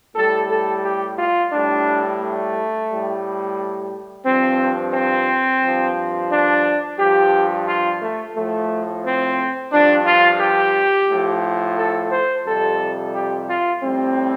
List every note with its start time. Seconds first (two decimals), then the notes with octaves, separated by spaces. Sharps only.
0.16 A2 G3 A4
0.50 A4
0.84 G4
1.18 F4
1.52 A2 G3 D4
2.21 A3
2.89 A2 G3
4.26 G2 F3 C4
4.94 C4
5.62 G2 F3
6.31 D4
6.99 G2 F3 G4
7.68 F4
8.02 A3
8.36 A2 F3 A3
9.04 C4
9.73 G2 F3 D4
10.06 F4
10.41 G4
11.10 A2 F3
11.78 A4
12.12 C5
12.46 F2 C3 G3 A4
13.14 G4
13.49 F4
13.83 A2 G3 C4